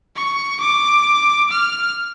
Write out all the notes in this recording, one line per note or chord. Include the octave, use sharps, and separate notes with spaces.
C#6
D6
F6